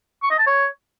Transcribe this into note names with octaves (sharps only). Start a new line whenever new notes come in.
C#6
D#5
A5
C#5